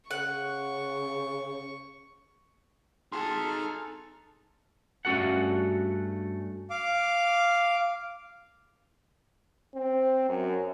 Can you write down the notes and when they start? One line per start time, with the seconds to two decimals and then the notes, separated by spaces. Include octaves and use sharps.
0.11 C#3 F#5 C#6
3.12 D#4 G#4 A4 A5 C6 F6
5.05 G2 A3 C#4 F#4 A4 F#5
6.70 F5 D6
9.75 C4
10.29 F#2